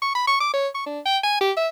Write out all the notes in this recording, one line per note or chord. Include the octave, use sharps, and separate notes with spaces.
C#6
B5
C#6
D6
C#5
C#6
D4
G5
G#5
G4
E5